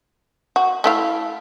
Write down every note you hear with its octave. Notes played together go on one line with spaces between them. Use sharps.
F#4
A3 E4 F5